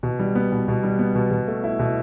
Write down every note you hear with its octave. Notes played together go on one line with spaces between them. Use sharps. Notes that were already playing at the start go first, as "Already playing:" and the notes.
B2
G3
B3
B2
B2
G3
B3
B2
B2
A3
E4
B2